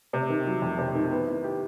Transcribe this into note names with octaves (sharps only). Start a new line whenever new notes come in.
C3
D#3
F#3
F2
C3
D#3
B3
E4
G4